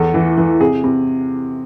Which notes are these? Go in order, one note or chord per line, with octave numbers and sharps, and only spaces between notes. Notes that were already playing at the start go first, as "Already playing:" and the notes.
Already playing: E2 A4
E3
E3
C3 G#4
C3